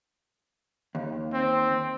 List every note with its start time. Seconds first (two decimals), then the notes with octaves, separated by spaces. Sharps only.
0.95 D#2
1.33 C4